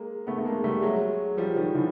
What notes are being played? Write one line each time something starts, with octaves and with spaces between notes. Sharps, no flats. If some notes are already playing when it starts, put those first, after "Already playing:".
Already playing: G#3 A#3
A3 B3
A3
G#3 A#3
G3 A3
F#3 G#3
F3 G3
D#3 F3
D3 E3